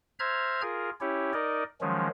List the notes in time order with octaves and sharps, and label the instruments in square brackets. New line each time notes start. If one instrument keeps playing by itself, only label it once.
[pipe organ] C5 E5 A#5 F6 G#6
F4 G#4 A#4
C#4 E4 G4 C#5
D#4 A#4 D5 D#5
D#3 F3 F#3 G#3 C#4